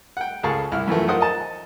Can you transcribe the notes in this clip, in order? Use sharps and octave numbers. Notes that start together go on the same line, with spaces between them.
F#5 G5
C#2 G#4 A4 F5 A5 C#6
C2 E4 F6
F#2 E3 F3 A3
D#4 F4 A#4 C5 F#5 D#6
D#5 A5